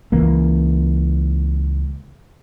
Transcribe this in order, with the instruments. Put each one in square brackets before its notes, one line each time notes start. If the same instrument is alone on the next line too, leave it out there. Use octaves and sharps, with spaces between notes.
[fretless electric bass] C#2 E3 A#3